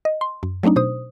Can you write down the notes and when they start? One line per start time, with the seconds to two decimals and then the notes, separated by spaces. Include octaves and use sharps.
0.05 D#5
0.21 C6
0.43 F#2
0.63 F#3 A3 C4 D4 D#4
0.76 B2 C5 D#6